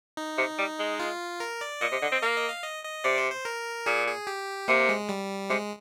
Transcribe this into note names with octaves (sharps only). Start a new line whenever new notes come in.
D#4
C3
G3
G#3
F4
A#4
D5
A#2 D#5
C3
D3
C4
A#3 F5
D#5
F5
D#5
D#5
C3 D5
C5
C5
A#4
A#2 G#4
G#4
G4
C3 A#3
G#3
G3
C3 G#3